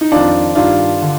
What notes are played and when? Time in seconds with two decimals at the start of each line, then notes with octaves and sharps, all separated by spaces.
0.01 D#4
0.12 F2 D#3 D4 F4
0.55 G2 D#3 D4 F4
1.02 D3